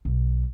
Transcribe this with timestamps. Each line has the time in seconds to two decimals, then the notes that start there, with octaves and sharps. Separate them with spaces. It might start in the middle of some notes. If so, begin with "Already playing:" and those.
0.05 B1